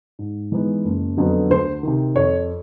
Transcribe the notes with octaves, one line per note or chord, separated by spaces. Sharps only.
G#2
E3 G#3 B3 D#4
F#1
F2 D3 F#3 B3
D2 C5
C3 D#3
F2 C#5